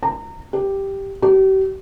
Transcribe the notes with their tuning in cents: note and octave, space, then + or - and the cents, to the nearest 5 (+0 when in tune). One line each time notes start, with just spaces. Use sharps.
A#5 -30
G4 +0
G4 -40